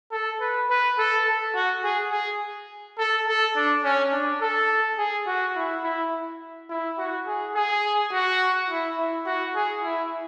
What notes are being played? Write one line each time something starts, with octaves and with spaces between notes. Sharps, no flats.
A4
B4
B4
A4
A4
F#4
G#4
G#4
A4
A4
D4
C#4
D4
A4
G#4
F#4
E4
E4
E4
F#4
G#4
G#4
F#4
E4
E4
F#4
G#4
E4